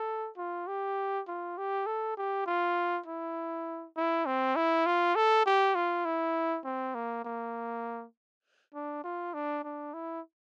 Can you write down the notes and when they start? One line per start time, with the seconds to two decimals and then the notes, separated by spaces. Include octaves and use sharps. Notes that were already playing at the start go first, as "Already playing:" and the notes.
Already playing: A4
0.37 F4
0.67 G4
1.28 F4
1.58 G4
1.87 A4
2.17 G4
2.46 F4
3.06 E4
3.97 E4
4.26 C4
4.56 E4
4.86 F4
5.16 A4
5.46 G4
5.75 F4
6.05 E4
6.65 C4
6.95 A#3
7.25 A#3
8.75 D4
9.04 F4
9.34 D4
9.64 D4
9.94 E4